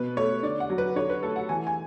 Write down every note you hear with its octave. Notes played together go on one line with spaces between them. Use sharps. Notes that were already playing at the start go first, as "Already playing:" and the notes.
Already playing: B2 B4
A3 C#5
D3 D5
F#5
F#3
B4
D3 C#5
B4
A3 A4
F#5
E3 G#5
G#5